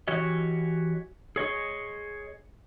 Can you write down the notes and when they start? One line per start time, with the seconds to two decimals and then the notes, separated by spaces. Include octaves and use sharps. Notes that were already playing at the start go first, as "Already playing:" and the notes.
0.08 E3 F#4 G4 C#5 D#5
1.36 G#4 C#5 D#5